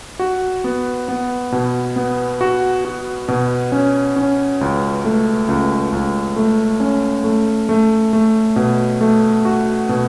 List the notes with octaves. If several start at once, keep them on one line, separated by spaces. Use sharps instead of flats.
F#4
B3
B3
B2
B3
F#4
F#4
B2
C#4
C#4
C#2
A3
C#2
C#2
A3
C#4
A3
A3
A3
B2
A3
F#4
B2